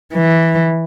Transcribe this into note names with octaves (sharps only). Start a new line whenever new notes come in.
E3